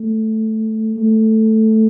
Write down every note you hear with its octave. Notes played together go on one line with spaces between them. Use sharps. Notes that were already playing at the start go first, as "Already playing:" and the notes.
Already playing: A3
A3